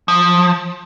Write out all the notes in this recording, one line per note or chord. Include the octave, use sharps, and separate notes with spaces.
F3